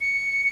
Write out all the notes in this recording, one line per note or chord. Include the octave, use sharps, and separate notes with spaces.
C#7